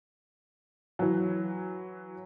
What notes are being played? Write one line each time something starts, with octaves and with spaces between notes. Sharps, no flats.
E3 F#3